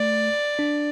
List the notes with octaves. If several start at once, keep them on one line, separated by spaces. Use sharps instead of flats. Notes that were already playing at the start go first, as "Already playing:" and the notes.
Already playing: A3 D5
D4